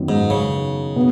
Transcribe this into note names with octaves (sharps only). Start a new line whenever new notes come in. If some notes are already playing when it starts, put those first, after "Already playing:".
Already playing: F#2 D#3 B3
G#2
C#3
B2 B3